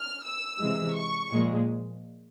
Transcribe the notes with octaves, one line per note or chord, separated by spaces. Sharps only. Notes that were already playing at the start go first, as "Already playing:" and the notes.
Already playing: F6
E6
C3 E3 G#3
C#6
A#2 F3 G#3